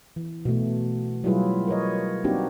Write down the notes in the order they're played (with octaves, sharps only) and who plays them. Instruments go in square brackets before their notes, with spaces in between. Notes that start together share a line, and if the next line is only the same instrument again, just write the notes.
[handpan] E3
B2 A3
F#3 G3 E4 F4 G#4 B4
A#4 B4 C#5 D#5
A#3 C4 D4 D#4 F#4 G4